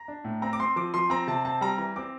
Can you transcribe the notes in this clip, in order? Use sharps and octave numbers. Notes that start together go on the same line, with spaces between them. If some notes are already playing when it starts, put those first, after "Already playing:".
Already playing: A#5
D4
A2
C4 A#5
D6
C4 C6
F3 D6
F3 C6
C4 A#5
C3 A5
C4 A5
G3 A#5
E3 A#5
C4 D6